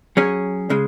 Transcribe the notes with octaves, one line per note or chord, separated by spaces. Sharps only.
F#3 C#4 G#4 C#5
C#3 G#3